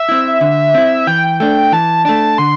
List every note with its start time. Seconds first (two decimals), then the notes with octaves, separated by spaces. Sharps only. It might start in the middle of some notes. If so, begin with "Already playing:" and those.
Already playing: E5
0.09 C4 E4
0.41 D3
0.74 C4 E4
1.07 E3 G5
1.40 A3 D4 G5
1.72 E3 A5
2.05 A3 D4 A5
2.38 D3 C6